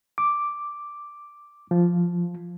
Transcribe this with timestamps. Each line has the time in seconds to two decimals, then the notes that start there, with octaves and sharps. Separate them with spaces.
0.18 D6
1.71 F3